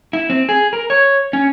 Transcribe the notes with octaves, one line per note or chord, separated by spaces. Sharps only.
E4
C4
G#4
A#4
C#5
C#4